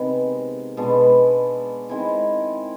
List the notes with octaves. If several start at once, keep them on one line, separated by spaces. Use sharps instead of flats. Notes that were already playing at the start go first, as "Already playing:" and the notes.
Already playing: C3 D#3 G#3 B3
B2 G#3 B3 D4
D#3 G#3 C4 E4